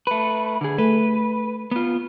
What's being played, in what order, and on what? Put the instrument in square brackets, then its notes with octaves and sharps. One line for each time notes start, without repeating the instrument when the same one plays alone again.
[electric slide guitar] A3 B4
D3 G#4
[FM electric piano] A3 [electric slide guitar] B4
[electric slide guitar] B3 F4